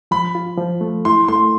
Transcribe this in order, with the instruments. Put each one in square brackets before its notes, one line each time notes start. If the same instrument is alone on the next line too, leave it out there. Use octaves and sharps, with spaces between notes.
[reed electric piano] F3 [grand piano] B5
[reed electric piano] F4
F3
A3
[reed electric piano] E4 [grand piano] C6
[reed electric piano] A3 [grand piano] C6